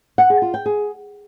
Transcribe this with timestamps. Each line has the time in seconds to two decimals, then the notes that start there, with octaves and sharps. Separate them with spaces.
0.18 F#5
0.30 G#4
0.42 F4
0.54 G5
0.66 G#4